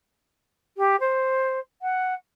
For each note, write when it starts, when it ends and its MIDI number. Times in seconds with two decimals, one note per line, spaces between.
0.77 0.95 67
1.00 1.59 72
1.81 2.14 78